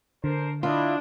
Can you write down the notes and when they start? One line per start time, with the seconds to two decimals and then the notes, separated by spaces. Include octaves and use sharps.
0.24 D3 D4 A#4 C5
0.63 D4 E4 F4 D#5